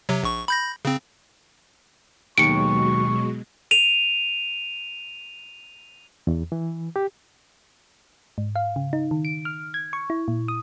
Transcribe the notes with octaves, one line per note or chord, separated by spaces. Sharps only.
C3 F#3
A#1 C#6
B5 G6 A#6
C#3 C4
D#2 B2 F#3 G#3 C#6 C#7 D7
D#7 F7
E2
E3
G4
G#2
F5
C#3
D#4
D#3
D7
F6
G#6
C#6
E4
A#2
D#6